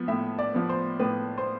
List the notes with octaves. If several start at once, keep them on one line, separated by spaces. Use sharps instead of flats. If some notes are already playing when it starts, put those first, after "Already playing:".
Already playing: F3 B3
A2 E5
D5
F3 B3
C5
A2 B4
C5